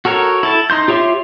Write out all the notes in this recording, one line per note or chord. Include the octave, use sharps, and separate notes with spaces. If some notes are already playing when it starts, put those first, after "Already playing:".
F#4 A4 A#4 C#5
E4 A4 A5
D#4 C6 G6
F4 G4 C#5 E5 C6